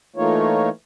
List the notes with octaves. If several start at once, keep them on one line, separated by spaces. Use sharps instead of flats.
E3 A3 A#3 D#4 F4 C#5